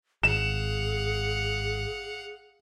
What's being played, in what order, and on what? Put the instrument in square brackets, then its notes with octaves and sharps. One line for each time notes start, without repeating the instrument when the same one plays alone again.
[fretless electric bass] G#1 [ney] G#4 [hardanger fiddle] F5 F#5 [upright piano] E7